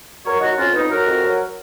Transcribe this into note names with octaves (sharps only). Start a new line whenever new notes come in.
F#3 A#4 C#5
F#3 D#4 F#4
F2 C#4 F4
F2 B3 D#4
F#3 F#4 A#4
F2
F#3